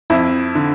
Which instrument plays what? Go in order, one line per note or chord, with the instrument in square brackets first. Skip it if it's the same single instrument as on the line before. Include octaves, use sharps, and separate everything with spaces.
[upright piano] F2 E4
D3